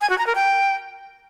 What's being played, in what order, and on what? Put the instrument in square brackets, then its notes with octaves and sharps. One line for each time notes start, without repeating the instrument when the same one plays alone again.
[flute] G#5
F#4
A#5
A#4
G5